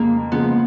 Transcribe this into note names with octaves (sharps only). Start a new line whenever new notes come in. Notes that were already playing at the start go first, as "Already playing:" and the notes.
Already playing: F2 C#3 F3 G#3 A#3
C#3 F3 G#3 B3